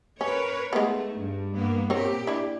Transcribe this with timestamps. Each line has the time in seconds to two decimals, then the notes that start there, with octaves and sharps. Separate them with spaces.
0.21 C#4 A#4 B4 C#5
0.73 G#3 A3 B3 D#4
1.16 G2
1.53 G2 A#3 B3
1.90 A#2 C4 G4 A#4 C#5
2.27 D4 E4